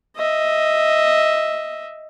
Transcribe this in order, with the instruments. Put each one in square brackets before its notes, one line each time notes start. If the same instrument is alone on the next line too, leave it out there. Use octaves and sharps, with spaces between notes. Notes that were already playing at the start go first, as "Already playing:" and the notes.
[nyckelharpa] D#5 E5